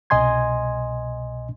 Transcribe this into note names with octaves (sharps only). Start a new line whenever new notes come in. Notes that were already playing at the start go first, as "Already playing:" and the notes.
C2 B2 D#5 G#5 C6 G#6